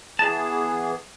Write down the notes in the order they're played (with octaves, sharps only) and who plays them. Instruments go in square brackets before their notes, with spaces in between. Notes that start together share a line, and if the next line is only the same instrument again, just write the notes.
[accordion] E3 B3 G#4 [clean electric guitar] A5